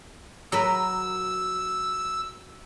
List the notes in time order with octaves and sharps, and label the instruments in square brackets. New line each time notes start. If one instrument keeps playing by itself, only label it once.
[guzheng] F#3 A#4 B4 [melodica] E6